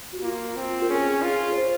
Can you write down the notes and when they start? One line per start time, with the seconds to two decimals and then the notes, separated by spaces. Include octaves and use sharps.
0.13 F#4
0.22 A#3 F4
0.56 C4
0.82 A#4
0.89 C#4 G#4
1.22 F4
1.52 C#5
1.56 C5